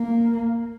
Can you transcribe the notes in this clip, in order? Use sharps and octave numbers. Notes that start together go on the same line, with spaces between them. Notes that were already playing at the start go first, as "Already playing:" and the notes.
Already playing: A#3